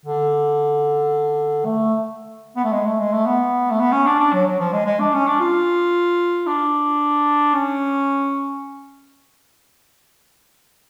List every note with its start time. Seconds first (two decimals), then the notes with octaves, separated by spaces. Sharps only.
0.06 D3
1.65 A3
2.56 B3
2.64 A3
2.72 G#3
2.86 A3
3.00 G#3
3.13 A3
3.26 B3
3.71 A3
3.80 B3
3.92 C#4
4.06 D4
4.19 D4
4.33 F#3
4.46 F#3
4.60 F3
4.73 G#3
4.86 G#3
5.00 D4
5.13 C#4
5.27 D4
5.40 F4
6.47 D4
7.54 C#4